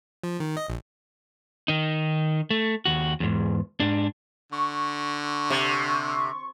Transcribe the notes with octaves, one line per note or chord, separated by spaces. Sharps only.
F3
D#3
D#5
A#1
D#3 D#4
A3
D#2 F#4
E2 G#2
G#2 D4
D3 C#6
C3